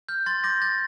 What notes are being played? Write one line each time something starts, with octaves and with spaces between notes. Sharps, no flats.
F6 G6
C6 A6
D6 G6 A#6
G6 A6